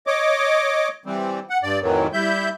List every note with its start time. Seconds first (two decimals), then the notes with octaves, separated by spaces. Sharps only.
0.07 C#5 D#5 D6
1.06 E3 G3 C4
1.50 F#5
1.63 G2 D5
1.82 F2 A2 D#3 E3 F#3
2.13 G3 E4 E5 G6